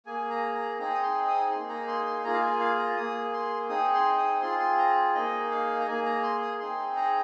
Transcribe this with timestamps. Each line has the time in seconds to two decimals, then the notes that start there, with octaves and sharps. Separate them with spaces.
0.06 A#3 G#4 G#5
0.30 A#5
0.55 A#5
0.79 C4 D#4 G#4 A#5
0.94 D#6
1.03 C6
1.27 D#6
1.51 A#3 D#4 G#4 C6
1.69 A#5
1.88 C6
2.06 C6
2.24 A#3 F4 G#4 A#5
2.34 F5
2.42 G#5
2.60 F5
2.79 A#5
2.96 A#3 G#4 D#6
3.33 C6
3.69 C4 D#4 G#4 D#6
3.94 C6
4.18 D#6
4.42 C4 F4 G#4 C6
4.60 C6
4.79 A#5
5.15 A#3 D#4 G#4 D#5
5.51 F5
5.80 A#5
5.87 A#3 G#4 G#5
6.05 A#5
6.23 C6
6.41 D#6
6.60 C4 D#4 G#4 C6
6.96 A#5